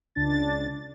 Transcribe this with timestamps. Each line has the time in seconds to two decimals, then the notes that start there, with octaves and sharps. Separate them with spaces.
0.15 C#2 D4 A6